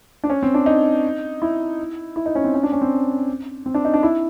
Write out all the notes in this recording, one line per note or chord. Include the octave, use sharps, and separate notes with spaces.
D4
C#4
C4
D4
D#4
E4
E4
D#4
C#4
C4
C#4
D4
C#4
C4
C4
D4
D#4
D4
E4